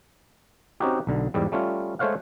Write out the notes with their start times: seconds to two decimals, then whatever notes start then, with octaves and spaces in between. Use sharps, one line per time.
0.80 C4 C#4 D#4 F#4 G4
1.07 B1 D3
1.34 E2 G#2 G3
1.52 G3 A3 C#4 F4
1.99 G#3 A3 C5 C#5 F5 F#5